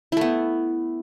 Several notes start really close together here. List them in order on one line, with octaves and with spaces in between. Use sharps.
E4 A3 B3